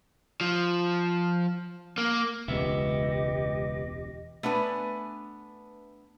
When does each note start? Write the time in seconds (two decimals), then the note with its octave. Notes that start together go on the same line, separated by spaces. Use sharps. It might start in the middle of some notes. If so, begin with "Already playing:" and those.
0.41 F3
1.98 A#3
2.48 E1 C#2 C#3 B3 G4 D#5 E5
4.43 A3 B3 D4 B4 G#5